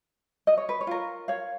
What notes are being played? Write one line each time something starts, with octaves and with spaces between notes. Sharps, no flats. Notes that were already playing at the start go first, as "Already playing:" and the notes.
D#5
C#5
B4
C#5
F4 A#4
C#5 F5